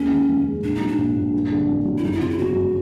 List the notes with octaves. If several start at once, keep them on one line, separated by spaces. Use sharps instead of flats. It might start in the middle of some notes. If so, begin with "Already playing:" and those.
Already playing: D#2 G#3 C#4
D#3
F1
G#3
A#2 D4
D#4
F#3
D4
A#1
A#1
G2
D3
A1
F#3
E4
F#2 D#4
E4
C#3 F4
E4
G1 F#4
F#3